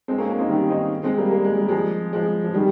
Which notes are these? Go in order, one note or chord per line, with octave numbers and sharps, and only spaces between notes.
G#3 C4
A#3 C#4
A#3 C#4
C4 D#4
D#3 G3
C4 D#4
G#3 C4
G3 A#3
A#3
G#3
G3
F3 G#3
F3 G#3
F3
D#3 G3